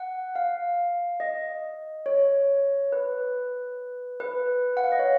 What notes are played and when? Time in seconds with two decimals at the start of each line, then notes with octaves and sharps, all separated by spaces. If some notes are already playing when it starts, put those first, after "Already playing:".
Already playing: F#5
0.36 F5
1.20 D#5
2.06 C#5
2.92 B4
4.20 B4
4.77 F#5
4.84 F5
4.92 D#5
4.99 C#5